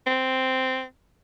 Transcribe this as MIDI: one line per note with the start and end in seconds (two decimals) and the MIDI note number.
0.07 0.83 60